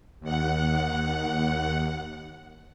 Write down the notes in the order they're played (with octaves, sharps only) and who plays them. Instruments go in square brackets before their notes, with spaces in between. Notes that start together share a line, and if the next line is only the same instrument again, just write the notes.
[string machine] D#2 F#5